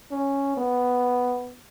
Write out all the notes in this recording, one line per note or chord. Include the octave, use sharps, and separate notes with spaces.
C#4
B3